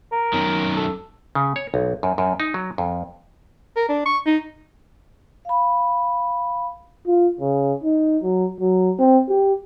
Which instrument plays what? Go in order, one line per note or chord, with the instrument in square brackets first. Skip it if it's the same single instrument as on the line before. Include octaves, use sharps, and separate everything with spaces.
[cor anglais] A#4
[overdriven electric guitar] F#2 D#3
[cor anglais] A4
[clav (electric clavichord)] C#3
C#5
B1
F#2
F#2
D#4
F#3
F2
[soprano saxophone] A#4
D4
C#6
D#4
[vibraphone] F5 B5
[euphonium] F4
C#3
D#4
F#3
F#3
C4
G4